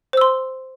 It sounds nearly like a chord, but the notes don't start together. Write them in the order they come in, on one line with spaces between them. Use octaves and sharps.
C5 E6 C6